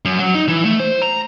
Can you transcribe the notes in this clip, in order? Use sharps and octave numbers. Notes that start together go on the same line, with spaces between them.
F#2
F#3
D#4
E3
A3
C5
A#5